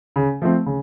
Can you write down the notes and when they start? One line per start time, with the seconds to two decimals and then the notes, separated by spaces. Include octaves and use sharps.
0.16 C#3
0.42 F3 A3 C4
0.66 C#3